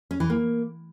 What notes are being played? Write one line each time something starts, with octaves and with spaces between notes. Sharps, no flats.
C#4
E3
A#3